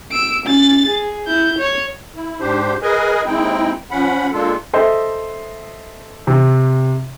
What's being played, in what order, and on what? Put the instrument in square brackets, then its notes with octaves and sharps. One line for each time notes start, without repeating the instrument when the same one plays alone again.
[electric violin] E6 D7
C#4 A6
G#4
E4 G6
C#5
[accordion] E4
G#2 D4 G4 C5
G#4 A#4 B4 D#5 G#5
D#2 G#3 C4 D#4 E4 G5
F3 C#4 F#5 B5
G#3 A#3 D4 F4 A4
[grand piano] A4 C5 D#5 E5
C3